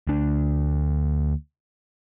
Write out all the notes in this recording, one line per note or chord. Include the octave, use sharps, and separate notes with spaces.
D2 D4